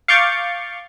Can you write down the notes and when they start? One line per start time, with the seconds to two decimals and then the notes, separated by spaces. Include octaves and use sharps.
0.08 F5 C#6 D6 G6 A6 C#7